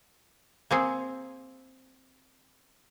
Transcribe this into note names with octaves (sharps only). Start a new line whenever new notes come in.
A#3 C4 G#4